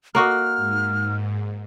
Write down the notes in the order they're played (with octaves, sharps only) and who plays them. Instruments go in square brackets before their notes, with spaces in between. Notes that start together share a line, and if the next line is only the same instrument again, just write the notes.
[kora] A#3 F#4 D#5 [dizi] F6
[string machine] G#2